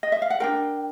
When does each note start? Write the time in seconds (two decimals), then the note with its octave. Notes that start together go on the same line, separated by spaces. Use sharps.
0.03 D#5
0.12 E5
0.22 F5
0.30 F#5
0.40 D4 F4 A#4 G5